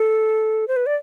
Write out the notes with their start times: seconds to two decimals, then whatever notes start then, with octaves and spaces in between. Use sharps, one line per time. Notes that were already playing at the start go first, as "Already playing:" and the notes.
Already playing: A4
0.68 C5
0.76 B4
0.86 D5